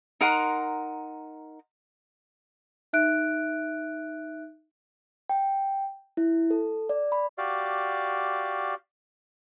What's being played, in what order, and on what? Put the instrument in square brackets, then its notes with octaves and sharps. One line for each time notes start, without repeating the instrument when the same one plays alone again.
[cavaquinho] D#4 A#4 F#5 C6
[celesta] D#4 E5 F#6 D7
[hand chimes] G5
E4
A4
D5
B5
[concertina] F#4 G4 D5 F5